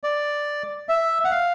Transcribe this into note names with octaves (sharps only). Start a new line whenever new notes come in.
D5
E5
F#5
F5